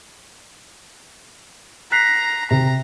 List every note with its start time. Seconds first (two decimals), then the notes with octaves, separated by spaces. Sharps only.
1.92 A#5 F#6 B6 C7
2.51 C3 A#5